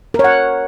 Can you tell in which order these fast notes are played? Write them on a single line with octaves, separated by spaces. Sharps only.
A#4 C#5 F#5